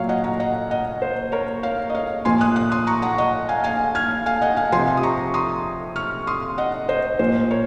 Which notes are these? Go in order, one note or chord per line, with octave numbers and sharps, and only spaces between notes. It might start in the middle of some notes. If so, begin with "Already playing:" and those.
Already playing: A#2 F#3 C#5 F5
D#5 F#5
F#5 A#5
D#5 F#5
D#5 F#5
C5
A#4 C#5
C#5 F5
D#5
C#5 F5
A#2 F3 G#5 C6
D#6 F#6
D#6 F#6
C6 D#6
A#5 C#6
F#5 A#5
D#5 F#5
F5 G#5
F5 G#5
F6 G#6
F5 G#5
D#5 F#5
F5 G#5
C3 F3 G#5 C6
D#6
A#5 C#6
C6 D#6
C#6 F6
C6 D#6
D#5 F#5
C5 D#5
A#2 F3 C5
A#4 C#5